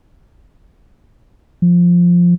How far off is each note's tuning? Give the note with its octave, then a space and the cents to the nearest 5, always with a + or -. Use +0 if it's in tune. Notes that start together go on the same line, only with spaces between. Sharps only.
F3 +5